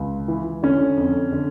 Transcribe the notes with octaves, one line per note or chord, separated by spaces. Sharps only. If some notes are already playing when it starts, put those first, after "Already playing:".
Already playing: C#2
E3
D3 C#4
F2
D3